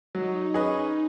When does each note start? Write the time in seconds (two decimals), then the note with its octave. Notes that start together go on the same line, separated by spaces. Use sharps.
0.14 F#3 D#4
0.54 C#4 G#4 B4 D#5